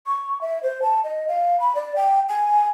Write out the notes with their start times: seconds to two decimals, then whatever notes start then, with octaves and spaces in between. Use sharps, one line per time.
0.06 C#6
0.41 E5
0.63 C5
0.82 A5
1.04 D#5
1.28 F5
1.60 B5
1.75 D5
1.96 G5
2.29 G#5